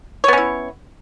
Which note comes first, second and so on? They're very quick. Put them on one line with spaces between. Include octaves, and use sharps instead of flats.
C#5 B3 C#4 E4